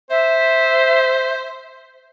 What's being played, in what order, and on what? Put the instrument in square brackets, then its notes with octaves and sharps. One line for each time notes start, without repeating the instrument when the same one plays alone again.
[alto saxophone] C5 [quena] E5